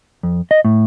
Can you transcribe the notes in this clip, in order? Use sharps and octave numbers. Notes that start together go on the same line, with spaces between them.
F2
D#5
A2